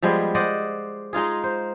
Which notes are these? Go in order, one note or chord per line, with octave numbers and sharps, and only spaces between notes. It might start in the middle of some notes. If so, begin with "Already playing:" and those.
F3 G3 G#3 B3
C5 D5 D#5 F#5
G#3 D#4 F4 G#4
C5